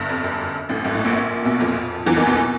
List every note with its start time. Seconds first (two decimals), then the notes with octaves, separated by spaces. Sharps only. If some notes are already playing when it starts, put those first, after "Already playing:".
Already playing: G1 G2
0.09 F2
0.24 F#2
0.69 A1 A2
0.85 G#1 G#2
0.95 A1 A2
1.04 A#1 A#2
1.45 B1 B2
1.60 F2 F3
2.06 E2 E3
2.16 D#2 D#3
2.26 B1 B2
2.37 B2